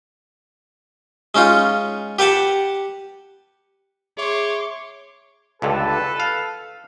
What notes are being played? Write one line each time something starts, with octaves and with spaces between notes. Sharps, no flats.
G#3 C#4 D#4 F4
G4 B4 F#5 A5
G#4 C#5 E5 C6 D6
C#2 G2 D3 A4 B4
F5